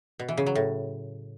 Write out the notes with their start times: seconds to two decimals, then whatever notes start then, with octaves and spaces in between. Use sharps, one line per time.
0.19 B2
0.28 E3
0.37 C#3
0.46 F#3
0.55 A2